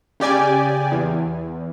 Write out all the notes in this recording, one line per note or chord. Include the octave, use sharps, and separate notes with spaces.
C#3 G4 D5 G#5
E2